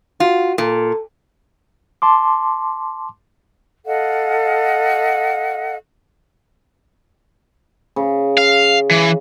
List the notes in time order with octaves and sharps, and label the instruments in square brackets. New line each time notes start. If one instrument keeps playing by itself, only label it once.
[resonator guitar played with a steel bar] F4 [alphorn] F#4
[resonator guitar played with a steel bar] A#2 [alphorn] A4
[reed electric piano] A5 C6 D6
[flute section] A4 D#5 F5 F#5
[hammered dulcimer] C#3
[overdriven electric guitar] F5
E3